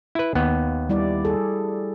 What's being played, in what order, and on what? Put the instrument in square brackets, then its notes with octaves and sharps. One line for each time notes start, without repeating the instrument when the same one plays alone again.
[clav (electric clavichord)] E4 B4
D#2 B3
[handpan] G3 E4 D5
G#4 A4